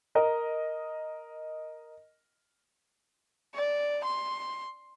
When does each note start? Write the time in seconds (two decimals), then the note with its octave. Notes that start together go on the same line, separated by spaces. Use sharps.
0.15 A#4 D#5
3.54 D5
4.04 C6